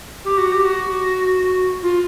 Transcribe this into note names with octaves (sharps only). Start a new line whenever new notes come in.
G4
F#4
G4
F#4
F4